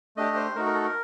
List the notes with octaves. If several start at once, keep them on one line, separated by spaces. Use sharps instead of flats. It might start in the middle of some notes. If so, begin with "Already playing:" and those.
A3 D4 G4 D#5
C5
A3 D#4 F#4 A#4
A#4
A4
A#4